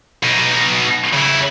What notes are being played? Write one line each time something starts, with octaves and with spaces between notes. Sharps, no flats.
B2 D#4
C#3 E4